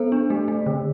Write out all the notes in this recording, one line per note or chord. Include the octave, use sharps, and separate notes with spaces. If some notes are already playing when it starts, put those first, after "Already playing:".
Already playing: B3 A4 C5
D4
A3
A3
D3